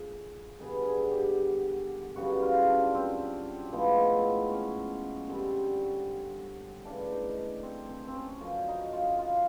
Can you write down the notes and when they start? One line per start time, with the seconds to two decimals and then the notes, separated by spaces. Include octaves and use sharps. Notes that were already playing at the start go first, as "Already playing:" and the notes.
Already playing: D3 F3 A#3 G#4
0.59 G2 D3 G3 B3 G#4
0.85 G#4
1.11 G4
2.16 F#2 C#3 E3 G3 F#4
2.42 F4
2.67 D4
2.94 C4
3.72 A2 F3 G#3 B3
4.51 C#4
5.28 D3 G3 C4
6.85 C#3 E3 A3 D4
7.11 D#4
7.37 D4
7.63 C4
7.89 C4
8.07 C4
8.15 C#4
8.41 F#2 D3 F3 C#4
8.68 D#4
8.93 F4
9.19 F4